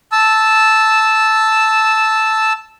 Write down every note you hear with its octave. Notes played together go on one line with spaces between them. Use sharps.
A5 E6